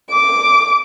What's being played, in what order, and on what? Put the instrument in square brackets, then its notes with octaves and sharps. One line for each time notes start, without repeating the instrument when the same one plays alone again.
[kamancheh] D6